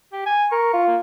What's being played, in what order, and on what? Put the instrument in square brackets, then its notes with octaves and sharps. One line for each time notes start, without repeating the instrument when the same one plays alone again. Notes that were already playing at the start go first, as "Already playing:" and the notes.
[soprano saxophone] G4
G#5
[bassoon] A#4 [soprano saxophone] C#6
[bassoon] F4
[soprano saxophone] A#3